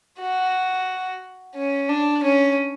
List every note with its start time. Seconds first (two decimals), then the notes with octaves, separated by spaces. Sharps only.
0.20 F#4
1.56 C#4
1.89 D4
2.24 C#4